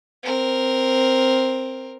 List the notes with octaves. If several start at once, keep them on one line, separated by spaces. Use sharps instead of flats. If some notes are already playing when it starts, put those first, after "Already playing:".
C4 A#4